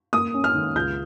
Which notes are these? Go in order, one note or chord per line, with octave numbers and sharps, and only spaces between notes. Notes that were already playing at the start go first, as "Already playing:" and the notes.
A#3 D#6
C#4
F6
D#3
C#2 G6